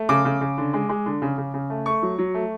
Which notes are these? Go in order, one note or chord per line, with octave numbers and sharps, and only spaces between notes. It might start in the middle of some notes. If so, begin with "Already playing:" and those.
Already playing: A3
C#3 D6
C#3
C#3
D3
G#3
G#3
D3
C#3
C#3
C#3
A3
A3 C#6
F#3
F#3
A3